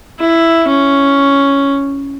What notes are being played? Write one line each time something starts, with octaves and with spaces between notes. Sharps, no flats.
E4
C#4